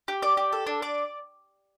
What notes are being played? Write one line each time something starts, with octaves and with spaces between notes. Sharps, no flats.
G4
D5
G4
A4
D4
D5